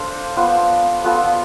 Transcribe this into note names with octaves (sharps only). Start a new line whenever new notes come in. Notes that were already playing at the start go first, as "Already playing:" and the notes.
Already playing: D4 A4 C5 F5
B3 F4 C5
B3 F4 A4